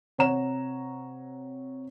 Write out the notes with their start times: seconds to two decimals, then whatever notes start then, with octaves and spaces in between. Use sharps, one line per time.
0.18 C3 C#5 F#5 A#5 E7